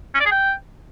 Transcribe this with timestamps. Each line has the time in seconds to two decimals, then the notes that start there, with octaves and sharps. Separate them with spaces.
0.15 C#4
0.20 D5
0.26 G#4
0.32 G5